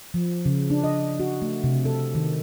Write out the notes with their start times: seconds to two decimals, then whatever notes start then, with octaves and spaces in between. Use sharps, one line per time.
0.14 F3
0.46 C#3
0.70 D4
0.84 D#5
1.20 F#4
1.42 A3
1.64 C3
1.85 A4
2.15 D#3